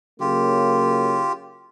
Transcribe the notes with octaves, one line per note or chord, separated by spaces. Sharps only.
C#3 F#3 A#3 F4 G4